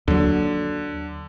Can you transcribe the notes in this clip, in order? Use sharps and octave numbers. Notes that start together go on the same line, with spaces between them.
D#2 D3 F#3